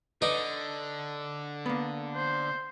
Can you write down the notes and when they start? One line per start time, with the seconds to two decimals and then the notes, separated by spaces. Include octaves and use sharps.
0.22 D3 D#4 B4 D5
1.66 A#3 B3
2.15 C5